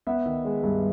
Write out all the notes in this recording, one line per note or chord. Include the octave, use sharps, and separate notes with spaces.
B3 E5 F#5
D#3
G#3
G2